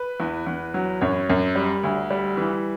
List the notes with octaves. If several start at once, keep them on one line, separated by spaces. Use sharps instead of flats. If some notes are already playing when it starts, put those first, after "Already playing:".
Already playing: B4
E2
E2
F#3
F#2 C#5
F#2
G3
D2
G3
E3